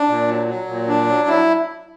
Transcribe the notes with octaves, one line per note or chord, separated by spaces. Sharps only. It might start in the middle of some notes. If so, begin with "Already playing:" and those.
Already playing: D4
A#2
F#3
F#3
A#2
D4
F#3
E4